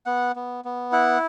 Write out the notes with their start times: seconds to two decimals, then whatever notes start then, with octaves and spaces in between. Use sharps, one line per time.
0.06 B3 F#5
0.36 B3
0.65 B3
0.92 E4 F#5